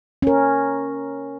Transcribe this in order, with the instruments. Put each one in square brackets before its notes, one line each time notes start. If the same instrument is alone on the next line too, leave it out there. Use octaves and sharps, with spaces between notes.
[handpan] C#4 A#4